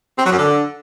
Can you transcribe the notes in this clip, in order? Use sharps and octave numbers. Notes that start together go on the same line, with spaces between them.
C4
F#3
F#2
D3